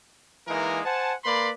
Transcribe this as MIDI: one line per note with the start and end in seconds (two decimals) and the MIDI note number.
0.48 0.80 52
0.48 0.80 56
0.48 0.80 58
0.48 0.80 63
0.48 0.80 70
0.85 1.13 72
0.85 1.13 78
0.85 1.13 80
0.85 1.13 81
1.24 1.51 58
1.24 1.51 71
1.24 1.51 74
1.24 1.51 83
1.24 1.51 84